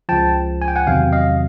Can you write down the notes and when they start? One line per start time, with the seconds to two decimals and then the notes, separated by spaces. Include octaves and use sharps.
0.09 C#2 C#3 F3 G5 A5
0.62 G#5
0.68 G5
0.76 F#5 G#5
0.87 E2 C3 D#3 F#3 F5 G5
1.12 D#5 F5